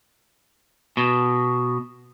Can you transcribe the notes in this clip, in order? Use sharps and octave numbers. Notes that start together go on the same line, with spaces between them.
B2